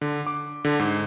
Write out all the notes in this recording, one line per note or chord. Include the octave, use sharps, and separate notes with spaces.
D3
D6
D3
G#2